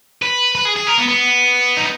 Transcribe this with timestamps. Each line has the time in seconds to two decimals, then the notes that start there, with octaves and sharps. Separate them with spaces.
0.22 B4
0.55 B4
0.65 G#4
0.77 G#4
0.87 A#4
0.98 B3
1.08 B3
1.77 D#4